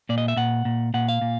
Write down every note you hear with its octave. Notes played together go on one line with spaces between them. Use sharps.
A#2 D5
D#5
E5
A#2 F#5
A#2
A#2 F#5
F5
A#2